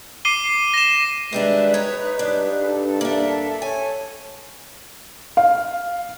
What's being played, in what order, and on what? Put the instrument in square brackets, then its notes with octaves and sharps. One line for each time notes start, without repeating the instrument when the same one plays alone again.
[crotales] D6 C7 D#7 G7
A#6 E7
[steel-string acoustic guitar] D#3 G3 D4 [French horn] G#3 [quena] B4 [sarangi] E5
[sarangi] D#4 [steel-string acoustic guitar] C#5 A#5
[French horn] G2 [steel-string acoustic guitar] D4
[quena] D#4 [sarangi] A4
[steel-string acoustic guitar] A#3 D4 [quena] E5
[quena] C#5 [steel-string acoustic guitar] G#5
[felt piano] F5